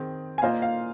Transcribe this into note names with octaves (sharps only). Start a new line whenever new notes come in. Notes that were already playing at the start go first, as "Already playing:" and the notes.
Already playing: D#3 C4 G#4
G#5
A#2 A#3 F4 C5 D#5 F5
F5